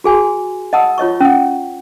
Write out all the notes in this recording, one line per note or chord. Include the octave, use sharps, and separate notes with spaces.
F#4 G#4 G#5 C6
D#5 F#5 A5 D#6 E6
F4 C#5 D#5 C#6
C#4 F#5